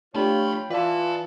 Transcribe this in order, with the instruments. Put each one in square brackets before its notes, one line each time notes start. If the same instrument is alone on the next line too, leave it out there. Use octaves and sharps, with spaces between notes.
[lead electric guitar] F3 B5 [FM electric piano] A3 D4 G4 [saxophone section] F4 C#5 [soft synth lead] G5
[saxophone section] E3 [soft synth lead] F4 [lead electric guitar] B4 A5 [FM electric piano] D5